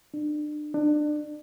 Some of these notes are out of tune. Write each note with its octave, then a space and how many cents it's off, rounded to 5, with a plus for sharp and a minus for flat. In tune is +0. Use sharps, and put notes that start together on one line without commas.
D4 +35
D4 +30